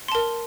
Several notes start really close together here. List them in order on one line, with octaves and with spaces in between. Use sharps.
C6 A5 A#4